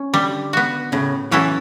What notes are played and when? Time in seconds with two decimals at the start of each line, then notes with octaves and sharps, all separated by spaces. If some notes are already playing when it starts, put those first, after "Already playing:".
Already playing: C#4
0.14 D3 G3
0.53 B3 F#4
0.92 A2 C#3
1.31 E3 F#3 C#4 E4 A4